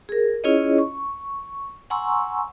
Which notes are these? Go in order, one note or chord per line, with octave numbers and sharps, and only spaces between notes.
G#4 A#4
C#4 E4 F4 G#4 C#5 D#5
C#6
F#5 G#5 A#5 C6 C#6 E6